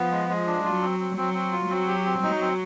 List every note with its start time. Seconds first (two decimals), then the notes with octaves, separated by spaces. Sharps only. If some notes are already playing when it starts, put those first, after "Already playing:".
Already playing: F3 B3
0.11 G#3
0.29 G#3
0.47 D4
0.64 F#3 F4
0.82 C4
1.00 C4
1.17 F#3 C4
1.34 C4
1.52 F4
1.69 F#3 C4
1.88 G4
2.05 C4
2.22 F#3 D#4
2.41 C4